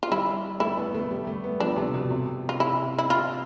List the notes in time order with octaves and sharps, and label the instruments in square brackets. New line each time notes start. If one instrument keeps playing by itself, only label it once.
[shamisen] F4
[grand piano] G3 [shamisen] E4
[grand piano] A3 [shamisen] E4
[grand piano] B3
A3
G3
A3
B3
[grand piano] F3 [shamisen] D4
[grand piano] C3
B2
C3
[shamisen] F4
[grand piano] C3 [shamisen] E4
[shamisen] E4
[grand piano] C3 [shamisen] F4